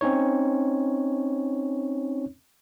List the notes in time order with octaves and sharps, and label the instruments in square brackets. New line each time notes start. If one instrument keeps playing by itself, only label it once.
[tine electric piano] C4 C#4 D#4 C#5